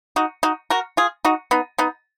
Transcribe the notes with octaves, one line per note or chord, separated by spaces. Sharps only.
D#4 F#4
D#4 F#4
F#4 A#4
F4 G#4
D#4 F#4
B3 D#4
B3 D#4